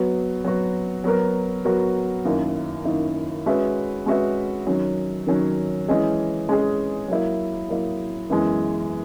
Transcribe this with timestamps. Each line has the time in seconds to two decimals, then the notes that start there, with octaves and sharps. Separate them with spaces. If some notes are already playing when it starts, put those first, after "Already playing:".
Already playing: F#3 B3 F#4
0.44 F#3 B3 F#4
1.04 F#3 B3 F#4 A#4
1.65 F#3 B3 F#4 A#4
2.25 F#2 D#3 A#3 E4
2.85 F#2 D#3 A#3 E4
3.46 G#3 C#4 F#4 B4 E5
4.06 G#3 C#4 F#4 B4 E5
4.67 D#3 F#3 C#4
5.27 D#3 F#3 C#4
5.88 E3 G#3 C#4 G#4 D#5
6.48 E3 G#3 C#4 G#4 D#5
7.08 F#3 A#3 E4
7.69 F#3 A#3 E4
8.30 F#2 E3 G#3 B3